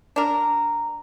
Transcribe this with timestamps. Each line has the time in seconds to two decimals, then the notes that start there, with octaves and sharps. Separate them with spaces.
0.16 D4 A#4